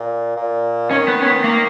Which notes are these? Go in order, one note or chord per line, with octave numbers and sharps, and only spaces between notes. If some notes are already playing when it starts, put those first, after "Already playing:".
Already playing: A#2
A#2
D#3 C#4
B3
C#4
B3
A#3